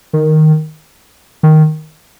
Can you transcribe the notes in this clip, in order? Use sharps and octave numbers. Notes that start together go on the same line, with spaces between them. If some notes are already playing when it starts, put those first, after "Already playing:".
D#3
D#3